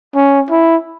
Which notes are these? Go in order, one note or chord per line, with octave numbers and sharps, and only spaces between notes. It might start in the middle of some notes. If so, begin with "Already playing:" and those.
C#4
E4